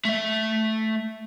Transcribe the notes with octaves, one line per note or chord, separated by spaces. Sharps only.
A3 E5